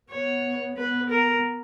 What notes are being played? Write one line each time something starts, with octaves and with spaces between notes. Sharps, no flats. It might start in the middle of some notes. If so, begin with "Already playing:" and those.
B3 C#5
B3 B4
A#4